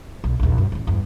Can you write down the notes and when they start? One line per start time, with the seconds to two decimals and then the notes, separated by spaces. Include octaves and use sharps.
0.24 B1
0.40 A#1 D#2
0.58 F#2
0.72 A1 E2
0.87 E2 G2